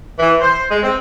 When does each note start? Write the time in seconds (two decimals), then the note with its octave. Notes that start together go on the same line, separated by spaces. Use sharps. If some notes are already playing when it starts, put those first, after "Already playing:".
0.19 E3
0.41 C5
0.69 G#3
0.83 C4